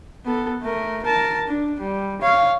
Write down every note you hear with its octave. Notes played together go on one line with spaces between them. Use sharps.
B3 A4
A3 A#4
A#4 A5
D4
G3
C#5 F5